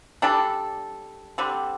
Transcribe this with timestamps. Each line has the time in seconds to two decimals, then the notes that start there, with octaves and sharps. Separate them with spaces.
0.22 G3 D4 A4
1.38 D3 G3 C4